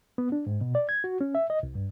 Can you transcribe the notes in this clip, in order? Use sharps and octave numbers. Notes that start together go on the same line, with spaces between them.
B3
D4
G#2
B2
D5
G#6
F#4
C#4
E5
D#5
C2
G2